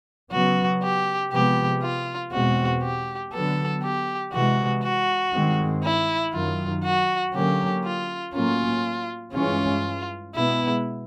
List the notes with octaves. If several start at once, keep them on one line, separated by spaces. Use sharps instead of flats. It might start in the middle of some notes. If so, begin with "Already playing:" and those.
C#3 F#3 B3 F#4
G4
C3 F3 G#3 B3 G4
F4
E2 B2 G#3 C4 F#4
G4
D3 F#3 B3 A4
G4
C3 E3 G#3 F#4
F#4
G2 D#3 G#3 C4
E4
F#2 D#3 F#3 F4
F#4
D3 F#3 A#3 C#4 G4
F4
A2 F#3 A#3 C#4 F4
G2 E3 G#3 C#4 F4
B2 G#3 B3 E4